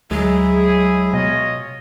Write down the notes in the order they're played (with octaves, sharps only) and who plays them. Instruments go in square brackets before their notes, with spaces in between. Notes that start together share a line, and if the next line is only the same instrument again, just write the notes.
[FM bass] D2 [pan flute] F#3 [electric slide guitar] G#3 [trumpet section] E4 G#4
[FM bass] B2 [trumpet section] F4 C#5 D#5